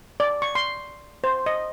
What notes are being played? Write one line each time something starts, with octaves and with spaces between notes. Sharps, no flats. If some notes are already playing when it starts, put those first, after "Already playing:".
D5
C#6
C6
C5
D#5